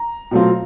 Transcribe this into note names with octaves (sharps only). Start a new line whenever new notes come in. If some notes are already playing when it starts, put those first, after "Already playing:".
Already playing: A#5
B2 F#3 A3 C4 F4